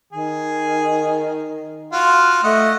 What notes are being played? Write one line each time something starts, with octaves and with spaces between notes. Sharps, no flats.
D#3 G#4
F4 F#4
A3 D#5 F#5